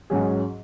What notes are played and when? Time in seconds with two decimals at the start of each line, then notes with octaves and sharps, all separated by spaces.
0.10 G#2 F#3 C#4 G#4